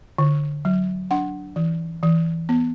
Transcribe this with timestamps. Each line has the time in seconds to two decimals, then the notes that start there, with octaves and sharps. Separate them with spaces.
0.18 D3
0.65 F#3
1.11 D4 F#5
1.56 E3
2.03 E3
2.49 B3